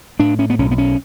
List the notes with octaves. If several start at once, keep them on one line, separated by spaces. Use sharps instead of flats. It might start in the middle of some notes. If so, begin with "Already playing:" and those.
A2 D4
C#4
B3
B1 C#4
B3
C#4